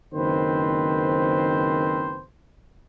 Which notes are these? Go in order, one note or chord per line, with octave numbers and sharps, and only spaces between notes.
F#1 D#3 C4 B4 C5